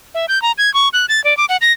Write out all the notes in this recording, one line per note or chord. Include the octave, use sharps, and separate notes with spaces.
E5
G6
A#5
G#6
C#6
F#6
A6
D5
D6
F#5
A#6